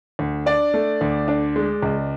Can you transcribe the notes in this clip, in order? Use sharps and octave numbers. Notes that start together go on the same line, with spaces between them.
D2
D4 D5
A3
D2
D4
G#3
C#2